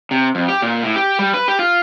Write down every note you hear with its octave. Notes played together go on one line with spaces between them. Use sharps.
C3
F2
G4
A#2
A2
G4
G3
B4
G4
F4